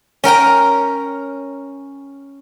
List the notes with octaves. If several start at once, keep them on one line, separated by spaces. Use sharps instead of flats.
C#4 A#4 G5 A#5